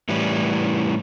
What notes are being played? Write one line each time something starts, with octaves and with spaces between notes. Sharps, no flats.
A2 E3 G3